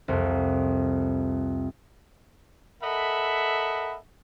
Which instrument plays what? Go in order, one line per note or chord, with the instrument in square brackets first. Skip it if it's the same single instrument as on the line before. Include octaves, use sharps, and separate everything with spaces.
[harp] C2 F2
[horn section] A4 A#4 D#5 E5 F#5 B5